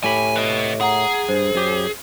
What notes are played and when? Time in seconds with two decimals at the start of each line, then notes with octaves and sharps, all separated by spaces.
0.04 A2 G4 G#5 B5
0.36 B4 D#5
0.81 G#4 F#5 A#5
1.29 G2 C5
1.55 F#2 G4